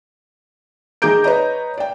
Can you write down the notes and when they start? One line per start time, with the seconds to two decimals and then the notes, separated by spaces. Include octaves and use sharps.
1.02 D#3 G#4 A#5 D6 G6 D7
1.24 B4 C#5 D#5 A#5
1.78 D5 G5